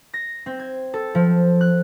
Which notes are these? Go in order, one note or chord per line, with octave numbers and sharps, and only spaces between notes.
A#6
C4
G#6
A4
F3
F#6